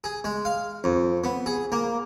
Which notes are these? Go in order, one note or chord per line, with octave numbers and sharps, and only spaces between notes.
G#4
G#3
F5
F2
B3
G#4
A#3